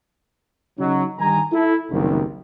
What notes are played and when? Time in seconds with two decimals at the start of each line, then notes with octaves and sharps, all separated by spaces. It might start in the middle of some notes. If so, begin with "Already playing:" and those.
0.78 C#3 F#3 D#4
1.19 G2 D#3 G#5 A#5
1.52 E4 A4
1.91 F#1 C2 D#3